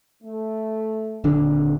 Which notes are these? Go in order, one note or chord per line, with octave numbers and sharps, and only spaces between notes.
A3
D#1 D3 D4